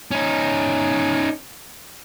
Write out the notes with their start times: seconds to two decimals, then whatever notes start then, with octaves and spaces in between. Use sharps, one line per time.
0.11 C#4 D#4